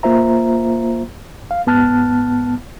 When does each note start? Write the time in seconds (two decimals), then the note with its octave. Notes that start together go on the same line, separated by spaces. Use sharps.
0.03 A#3 F4 C5 E5 A#5
1.51 F5
1.67 G#2 B3 A5 F6 F#6 A6